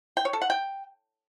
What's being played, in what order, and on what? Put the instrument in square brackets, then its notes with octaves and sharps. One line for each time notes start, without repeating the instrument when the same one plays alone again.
[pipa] G5
C#5
A4
F#5
G5